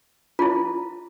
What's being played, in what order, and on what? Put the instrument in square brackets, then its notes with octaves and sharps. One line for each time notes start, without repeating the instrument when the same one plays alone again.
[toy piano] E4 F4